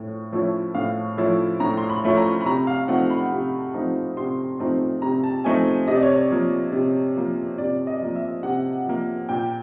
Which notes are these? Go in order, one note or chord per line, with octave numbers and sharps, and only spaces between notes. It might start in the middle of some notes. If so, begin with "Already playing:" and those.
Already playing: A2 F3 C#4
F3 A3 C#4 E4
A2 F5
F3 A3 C#4 E4
A2 A#5
C6
B5
F3 A3 C#4 E4
A#5
B5
C3 A#5
F5
F3 A3 C4 D#4 F#5
B5
C3
F3 A3 C4 D#4
C3 C6
F3 A3 C4 D#4
C3 A#5
A5
F3 A3 C4 D#4 G#5
C3 D#5
D5
C#5
D5
F3 A#3
C3
F3 A#3
C3 D5
D#5
F3 A#3
E5
C3 F#5
F3 A#3
A#2 G5